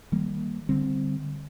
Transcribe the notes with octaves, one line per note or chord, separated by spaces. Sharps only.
D#3 G3 A#3
D3 G3 C4